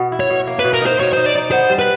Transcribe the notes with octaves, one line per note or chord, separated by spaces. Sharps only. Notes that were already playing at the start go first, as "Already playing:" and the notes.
Already playing: B2 B3
E4
C#5
B2
A#3
B4
B2
A#4
D#4 C5
B2 C#5
D#4 C5
D5
D#4
B3 C5
G3
B4